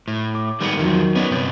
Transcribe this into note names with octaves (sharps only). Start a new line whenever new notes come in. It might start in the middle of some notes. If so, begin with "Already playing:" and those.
A2
D6
D#3 G3 G#3 B3 C#7
E2 D#3 F3 F#3
B3 C#4 D#4
G2 C3 C#4